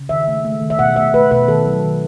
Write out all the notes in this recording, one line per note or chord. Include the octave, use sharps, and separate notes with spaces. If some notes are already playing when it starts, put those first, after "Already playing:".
Already playing: C#3
D#3 E5
A3
A3
D#3
E5
B2 F#5
A3 E5
A3 B4
B2 B4
D#3 A4
F#3
D#3